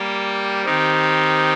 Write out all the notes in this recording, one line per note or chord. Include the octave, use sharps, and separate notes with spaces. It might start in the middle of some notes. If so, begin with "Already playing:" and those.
Already playing: G3 A#3 G4
D#3 C4 D#4 G4